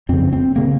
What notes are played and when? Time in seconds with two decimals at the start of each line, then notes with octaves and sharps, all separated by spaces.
0.09 F2 C#3 C4
0.33 C4
0.56 C#3 A#3